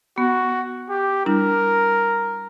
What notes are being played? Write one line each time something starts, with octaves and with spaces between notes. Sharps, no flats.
B3 F#4
G4
G3 D4 E4 A#4